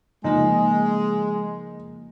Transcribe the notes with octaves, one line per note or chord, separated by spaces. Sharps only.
C#3 F3 G#3 A#3 D#4